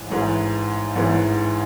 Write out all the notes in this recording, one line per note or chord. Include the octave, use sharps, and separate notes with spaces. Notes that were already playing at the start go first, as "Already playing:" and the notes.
Already playing: A1 G#2 E3
A1 G#2 E3
A1 G#2 E3